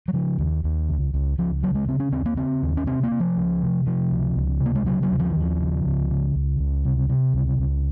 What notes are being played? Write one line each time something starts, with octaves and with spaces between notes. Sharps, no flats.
F#3
C#3 F3
D#2
D#2
C#2
C#2
C#2 F3
C#3 F#3
G#3
C#3 C4
C#4
D#2 C4
A#3
C#3 C4
D#2
C#4
C3 C4
A#3
C3
F3
C#2
C3
C3 F3
C#2
C#2
C3
A#3
G#3
C#3 F#3
F#3
D#2
F3
D#3
D#2 F3
C#3
C#2
C#3
C#2
C#2
C3
C3
C#2
C#2